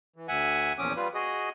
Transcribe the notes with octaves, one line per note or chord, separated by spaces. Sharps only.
E3
D2 E5 F#5 G#5
E2 A#2 F3 C#4 D6 D#6
G3 F4 B4
F#4 G#4 D#5